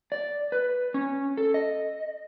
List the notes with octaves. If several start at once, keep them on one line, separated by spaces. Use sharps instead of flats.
D5
B4
C#4
A4
D#5